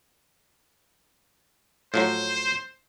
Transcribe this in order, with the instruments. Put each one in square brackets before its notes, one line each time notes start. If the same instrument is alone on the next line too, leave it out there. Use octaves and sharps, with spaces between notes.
[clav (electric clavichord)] A2 F3 F#3 [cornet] C5